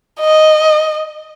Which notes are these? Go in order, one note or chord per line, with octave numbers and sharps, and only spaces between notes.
D#5